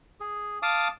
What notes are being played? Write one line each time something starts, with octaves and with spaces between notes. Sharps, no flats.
G#4
F5 A5 D6 D#6